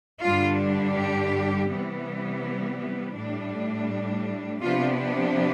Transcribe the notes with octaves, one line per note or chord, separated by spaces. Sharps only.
G2 D3 G3 D4 F4
G4
C3 E3 G3 B3
A2 G3 D4
C3 F3 B3 D4 F4